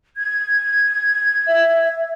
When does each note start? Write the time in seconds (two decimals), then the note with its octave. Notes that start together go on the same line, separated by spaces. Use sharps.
0.16 G#6
1.47 E5